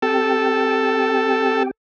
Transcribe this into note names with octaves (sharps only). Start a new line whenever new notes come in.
C4 G4 A4 G5